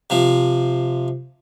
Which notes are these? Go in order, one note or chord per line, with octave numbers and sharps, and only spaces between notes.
C3 F3